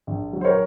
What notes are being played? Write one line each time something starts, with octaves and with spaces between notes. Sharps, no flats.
A#1
F#3
C5
A#4 C#5